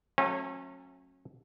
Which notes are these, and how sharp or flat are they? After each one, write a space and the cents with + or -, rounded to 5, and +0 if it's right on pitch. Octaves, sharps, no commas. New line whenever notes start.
F#3 -20 A3 +0 C#4 -35